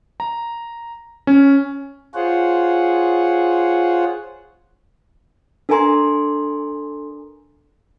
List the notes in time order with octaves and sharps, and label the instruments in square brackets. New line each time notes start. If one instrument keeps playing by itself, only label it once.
[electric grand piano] A#5
C#4
[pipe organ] F4 G#4 C5 C#5 F#5
[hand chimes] D4 A4 A#4 G#5 A#5 C6